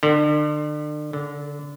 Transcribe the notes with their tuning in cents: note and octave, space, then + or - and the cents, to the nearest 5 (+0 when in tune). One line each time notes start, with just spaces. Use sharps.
D3 +35
D3 -25